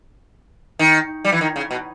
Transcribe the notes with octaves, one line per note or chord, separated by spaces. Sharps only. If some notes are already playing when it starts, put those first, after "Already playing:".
D#3
G3
E3
D#3
C#3
B2